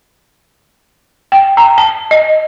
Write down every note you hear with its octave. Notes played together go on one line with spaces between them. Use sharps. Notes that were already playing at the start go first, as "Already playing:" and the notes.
G5
A#5
A5
D#5